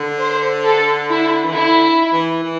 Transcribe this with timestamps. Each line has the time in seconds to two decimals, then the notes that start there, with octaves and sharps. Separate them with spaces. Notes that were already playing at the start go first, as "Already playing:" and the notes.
Already playing: D3
0.20 C5
0.65 A4
1.10 E4
1.45 E3
1.54 D3 E4
2.13 E3
2.43 E3